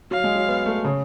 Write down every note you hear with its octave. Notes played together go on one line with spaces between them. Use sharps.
F#3 F5
G#3
F#3
B3
A3
C#3